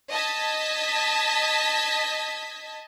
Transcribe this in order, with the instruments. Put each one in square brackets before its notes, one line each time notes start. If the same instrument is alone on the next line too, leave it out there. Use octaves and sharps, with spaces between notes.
[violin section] D#5 A5 G#6 B6